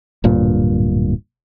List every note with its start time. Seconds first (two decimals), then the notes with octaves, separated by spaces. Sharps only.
0.24 D1 G2 A#2